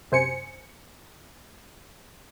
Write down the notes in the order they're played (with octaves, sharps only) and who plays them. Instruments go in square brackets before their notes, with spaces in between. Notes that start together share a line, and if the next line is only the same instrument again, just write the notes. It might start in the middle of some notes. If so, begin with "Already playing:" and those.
[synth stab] F#2 C3 C5 G#5 C#7